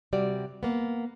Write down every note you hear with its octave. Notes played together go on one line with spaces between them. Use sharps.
C3 G3 F#4 D5
A#3 B3